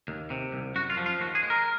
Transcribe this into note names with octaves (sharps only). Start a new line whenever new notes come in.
D#2
C3
C2
F#2 F#4
F4
F3
F4
D#2 F#4
G#4
G#3
A#4